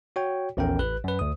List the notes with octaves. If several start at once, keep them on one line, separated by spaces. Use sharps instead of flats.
F#4 C#5 G5
A#1 E2 C#4 A4 A#4 G5
A1 B4 F#6
F#2 B4
D2 D#6